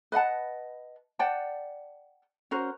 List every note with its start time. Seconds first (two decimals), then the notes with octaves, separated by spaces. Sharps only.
0.12 B4 D#5 F#5 A5
1.19 D5 F#5 G5 A5
2.51 C#4 F#4 A#4 C5